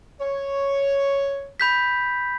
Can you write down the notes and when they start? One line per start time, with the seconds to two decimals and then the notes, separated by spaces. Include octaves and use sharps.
0.21 C#5
1.60 B5 G6 B6